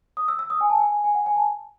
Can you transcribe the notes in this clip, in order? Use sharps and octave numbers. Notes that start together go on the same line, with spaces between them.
D#6
E6
E6
D#6
G#5
A5
G#5
G#5
F#5
G#5
A5